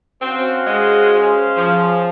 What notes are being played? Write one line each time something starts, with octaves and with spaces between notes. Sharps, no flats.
C4 C#4 F#4 C5 F5
G#3
C#4 G#4 C5 F5
F3